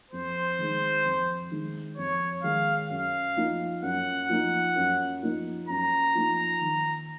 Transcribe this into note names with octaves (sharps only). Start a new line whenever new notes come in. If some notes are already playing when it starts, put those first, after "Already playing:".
F2 C5
D#3 G#3 D#4
F2
D#3 G#3 D#4
F2 C#5
D#3 G#3 D#4 F5
F#2 F5
F3 A#3 D#4
F#2 F#5
F3 A#3 D#4
F#2
F3 A#3 D#4
F#2 A#5
F3 A#3 D#4
D#3